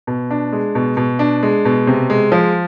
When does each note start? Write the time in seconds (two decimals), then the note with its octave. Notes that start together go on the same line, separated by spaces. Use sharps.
0.07 B2
0.31 D4
0.52 G#3
0.75 B2
0.97 B2
1.19 D4
1.43 G#3
1.65 B2
1.87 C3
2.10 G#3
2.32 F3